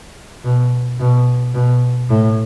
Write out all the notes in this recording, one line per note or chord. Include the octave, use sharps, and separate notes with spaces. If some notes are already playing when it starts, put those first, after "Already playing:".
B2
B2
B2
A2